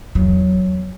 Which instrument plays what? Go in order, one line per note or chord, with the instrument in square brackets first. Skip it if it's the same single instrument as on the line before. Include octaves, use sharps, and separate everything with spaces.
[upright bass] E2 F#3